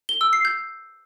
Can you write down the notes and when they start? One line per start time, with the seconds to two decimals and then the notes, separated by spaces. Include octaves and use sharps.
0.09 G7
0.21 E6
0.33 C7
0.45 G6